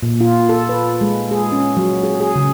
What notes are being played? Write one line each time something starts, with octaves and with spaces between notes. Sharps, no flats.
A#2
F4
A4
B4
G#3
G#4
C#4
F#3
G#4
G#4
C#3